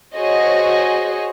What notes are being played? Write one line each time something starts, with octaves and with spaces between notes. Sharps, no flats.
F#4 G#4 C5 C#5 D#5